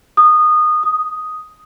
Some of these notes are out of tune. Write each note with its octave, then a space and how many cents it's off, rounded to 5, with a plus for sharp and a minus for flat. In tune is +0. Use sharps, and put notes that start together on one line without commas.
D#6 -20
D#6 +5